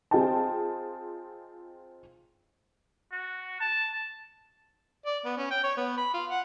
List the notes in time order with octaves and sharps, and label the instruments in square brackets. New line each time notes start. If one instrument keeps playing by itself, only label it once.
[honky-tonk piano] C4 F4 G#4 D#5 G5 A5
[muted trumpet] F#4
A5
[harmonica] D5
B3
C#4
G5
C#5
B3
B5
F4
F#5